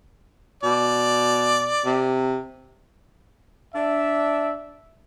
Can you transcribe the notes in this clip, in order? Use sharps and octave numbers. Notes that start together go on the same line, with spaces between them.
B2 D5
C3
D4 E5